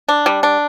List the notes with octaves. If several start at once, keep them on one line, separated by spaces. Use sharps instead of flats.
D4
G3
D4